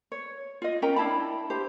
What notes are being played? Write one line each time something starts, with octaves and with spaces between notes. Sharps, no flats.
C#5
F4 D#5
C#4 A#4 G5 A#5
D4 E4 A5 B5
G4 C5